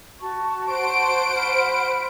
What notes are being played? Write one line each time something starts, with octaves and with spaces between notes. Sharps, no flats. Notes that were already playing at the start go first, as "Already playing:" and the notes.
F#4 A5 C#6
C5 F#5 D7
B5 F6